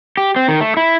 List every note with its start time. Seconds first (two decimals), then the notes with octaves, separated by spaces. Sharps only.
0.17 G4
0.36 C4
0.48 D#3
0.60 A3
0.77 E4